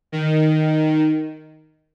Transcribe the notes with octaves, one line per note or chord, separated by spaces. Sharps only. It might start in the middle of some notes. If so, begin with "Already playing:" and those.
D#3